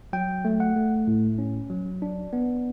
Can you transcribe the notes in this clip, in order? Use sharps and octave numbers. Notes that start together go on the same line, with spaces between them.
F#3 G5
A3
F#5
A3
A2
C#4
F#3
D4
B3